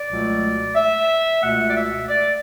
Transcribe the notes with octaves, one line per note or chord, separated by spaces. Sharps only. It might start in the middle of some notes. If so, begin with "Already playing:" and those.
Already playing: D5
C#2 B2 F#3 A3
E5
C#2 B2 A3 F#5
D5
E5
D5